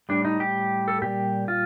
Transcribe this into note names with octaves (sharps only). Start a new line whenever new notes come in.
A2 G3 D4
D#4
G4
A4
A#2 G3 G4
F4